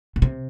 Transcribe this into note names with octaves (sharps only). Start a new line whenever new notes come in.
B2
C3